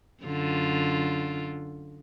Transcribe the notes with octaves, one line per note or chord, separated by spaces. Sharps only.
F#2 D3 F4